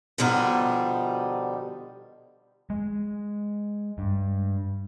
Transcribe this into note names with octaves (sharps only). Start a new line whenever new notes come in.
B2 D3 F3 G3 D#4
G#3
G2